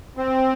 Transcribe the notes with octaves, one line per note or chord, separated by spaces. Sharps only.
C4